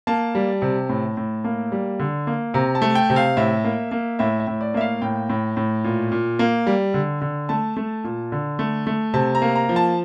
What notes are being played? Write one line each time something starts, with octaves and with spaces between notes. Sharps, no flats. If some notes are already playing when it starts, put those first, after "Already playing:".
A#3 A5
G3
C3
A2
A2
A#3
G3
D3
A#3
C3 A#5
A5
A3
G5
C3
F5
A2 E5
A#3
A#3
A2 E5
E5
A2
D5
A#3 E5
F5
A2 G5
A2
A2
A#2
A#2
A#3
G3
D3
D3
A3 A5
A3
A#2
D3
A3
A3
C3 A5
A#5
A#3
A#5
F3
A5